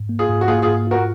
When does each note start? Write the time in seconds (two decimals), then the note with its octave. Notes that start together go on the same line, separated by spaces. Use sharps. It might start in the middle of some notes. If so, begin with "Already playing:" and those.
Already playing: G#2
0.09 A#3
0.19 F4 G#4
0.30 G#2
0.41 F#4
0.48 A#3 F4 G#4
0.62 G#2 F4 G#4
0.87 F4 F#4 A#4